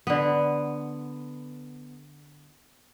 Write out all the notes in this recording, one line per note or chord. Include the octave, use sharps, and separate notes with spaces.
D3 B3